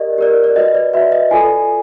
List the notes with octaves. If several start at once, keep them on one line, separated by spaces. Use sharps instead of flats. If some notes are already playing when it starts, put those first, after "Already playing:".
Already playing: G4 A#4 D5 D#5
G4 A#4 D5
D5
F#4 B4 D5 D#5
D5
F#4 B4 D5 E5
D#5
F4 A4 D5 G#5